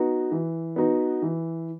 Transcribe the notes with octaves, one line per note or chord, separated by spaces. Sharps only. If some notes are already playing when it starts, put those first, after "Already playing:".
Already playing: B3 D#4 F#4
E3
B3 D#4 F#4
E3